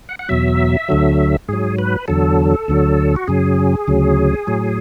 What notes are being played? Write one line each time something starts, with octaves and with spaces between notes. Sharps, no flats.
F#5
F#5
E2 B2 F#3 E5
D2 D3 F#3
G#2 F#3 G#4
B4
E2 D3 F#3 A4
D2 D3 F#3
F#4
F#2 C#3 F#3 G#4
D2 C#3 F#3
A2 F#3